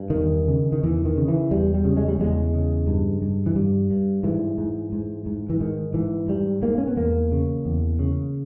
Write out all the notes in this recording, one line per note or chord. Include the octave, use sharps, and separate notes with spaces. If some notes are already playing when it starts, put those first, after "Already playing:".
Already playing: G2
E2 D#3
C#3
D#3
E2 E3
D#3
C#3
E3
E2 G3
G3
C#3
G#3
G3
E2 G#3
C#3
G2
G2
E3
G2 G3
G2
G#2 E3
G#2
G#2
G#2
E3
G#2 D#3
G#2 E3
G#2 G3
G#2 A#3
C#4
B3
E2 A#3
C#3
E2
C#3